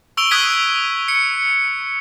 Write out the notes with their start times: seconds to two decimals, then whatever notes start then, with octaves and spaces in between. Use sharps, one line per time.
0.17 C#6 E6 D7 F7 G7
0.31 D#6 F#6 G#6 B6 D#7 G7
1.08 C#7